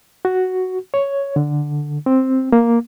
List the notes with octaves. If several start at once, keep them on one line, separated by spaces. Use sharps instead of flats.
F#4
C#5
D3
C4
A#3